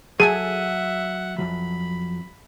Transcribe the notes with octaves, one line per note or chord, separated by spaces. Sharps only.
F#3 G#4 A4 E5 F#5 G#5 D#7
F2 F3 F#3 B5